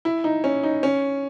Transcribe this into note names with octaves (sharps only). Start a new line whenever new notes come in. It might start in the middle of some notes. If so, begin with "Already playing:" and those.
E4
D#4
C#4
D#4
C#4